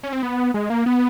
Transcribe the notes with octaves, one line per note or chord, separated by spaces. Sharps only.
C#4
C4
B3
G#3
A#3
B3